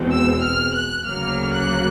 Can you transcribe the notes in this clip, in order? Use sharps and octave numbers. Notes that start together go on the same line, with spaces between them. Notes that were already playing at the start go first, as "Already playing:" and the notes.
Already playing: E2 B2 G#3 C4
E6
F6
F#6
D2 C#3 F#3 A#3 F6
F#6